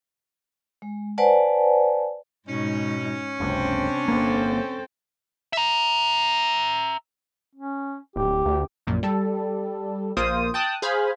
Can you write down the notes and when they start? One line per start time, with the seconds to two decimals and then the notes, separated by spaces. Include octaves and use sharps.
0.82 G#3
1.18 B4 C5 D5 F#5 G#5 A5
2.49 G#2 B2 C#4 D#4
3.40 F#1 C#2 C3 C4 D4
4.08 G1 A#3 C4 A4
5.53 E5 A#5
7.55 C#4
8.16 D1 G4
8.46 D2
8.87 A#1 F#2 A#2
9.03 G3 A4
10.17 A#1 A#3 F4 C5 D#6
10.54 G5 A5 D#6 F#6
10.82 G#4 C5 F5 G#5 B5